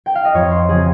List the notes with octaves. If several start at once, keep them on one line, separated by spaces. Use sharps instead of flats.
G5
F5
D#5
F2 C#5
C5
C#3 F3 C4 G#4